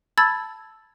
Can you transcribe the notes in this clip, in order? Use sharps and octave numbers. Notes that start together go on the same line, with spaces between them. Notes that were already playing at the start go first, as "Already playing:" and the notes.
A5 B5 E6 G#6 A6